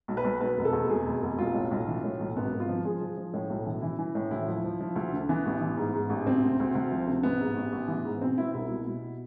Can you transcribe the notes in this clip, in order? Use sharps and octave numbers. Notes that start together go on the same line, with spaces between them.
B1
B4
B1
B2 B4
F1
A4
E2
B2 G#4
F1
F1
B1 F4
A2
B1
E3
A2
B1
G#1 B3
G#1
F4
F3
F3 G#4
F3
F3
A2
B1
E3
E3 E4
E3
A2
D2 E4
F3
F3
F3
D2
D3
E3 B3
A1
E3
G#2
G#2
A1
D2 C4
C3
D2
D2
F3
C3
A1 B3
G#2
A1
A1
E3
G#2
B2 C4
B2 E4
C2 E4
B2
B2